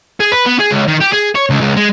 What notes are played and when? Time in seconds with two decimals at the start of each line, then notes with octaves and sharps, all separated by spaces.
0.20 G#4
0.32 B4
0.46 B3
0.59 G#4
0.71 C#2
0.87 D#3
1.00 G4
1.12 G#4
1.35 C#5
1.50 C#2
1.61 C#2
1.77 G#3